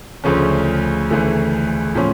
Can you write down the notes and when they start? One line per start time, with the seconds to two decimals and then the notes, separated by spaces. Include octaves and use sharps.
0.24 D2 C#3 F3 A3 C#4
1.10 D2 C#3 E3 A3
1.95 A2 F3 C#4